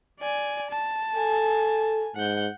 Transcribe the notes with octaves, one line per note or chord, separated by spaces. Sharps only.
D5 G#5
A5
A4 G#5
G#2 F#5 G6